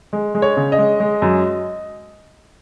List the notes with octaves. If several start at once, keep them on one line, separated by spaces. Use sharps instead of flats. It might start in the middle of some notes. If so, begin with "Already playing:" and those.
G#3
G#3
C#5
C#3
D#5
G#3
G#3
F#2